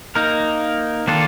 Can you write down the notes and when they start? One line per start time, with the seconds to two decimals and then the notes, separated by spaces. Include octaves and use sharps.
0.15 A#3 D#4 A#4
1.07 D#3 A#3 D4 F4 A4